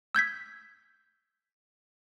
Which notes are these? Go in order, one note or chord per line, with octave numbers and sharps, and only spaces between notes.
E6 G6 G#6 B6